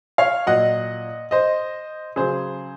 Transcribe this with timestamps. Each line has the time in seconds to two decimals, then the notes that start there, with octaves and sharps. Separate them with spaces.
0.18 C#5 F5
0.46 A#2 F#3 D#5 F#5
1.31 C5 D#5
2.16 C#3 F#3 G#4 C5